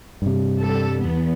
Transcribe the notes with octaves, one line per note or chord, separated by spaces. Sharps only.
G2 C3
G3 A4
E2 B3